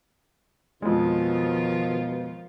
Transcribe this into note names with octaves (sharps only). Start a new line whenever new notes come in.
F2 B2 D#3 F3 G#3 F4